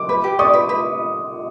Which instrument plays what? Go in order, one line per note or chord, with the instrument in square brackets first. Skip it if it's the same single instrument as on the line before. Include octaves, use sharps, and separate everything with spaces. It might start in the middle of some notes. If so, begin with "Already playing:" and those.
Already playing: [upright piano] D6
[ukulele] B4
G4
[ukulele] D5 [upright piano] C#6 D#6
[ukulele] B4
B4